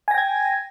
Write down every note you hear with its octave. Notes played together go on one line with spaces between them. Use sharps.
G5 G#5 G#6 A#6